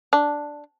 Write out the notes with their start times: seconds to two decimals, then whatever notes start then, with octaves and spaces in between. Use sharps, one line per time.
0.13 D4